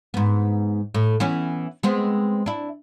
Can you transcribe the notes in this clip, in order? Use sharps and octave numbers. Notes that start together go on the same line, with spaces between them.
G#2 B3
A2
E3 B3 C#4
G#3 B3 C4
D4 E4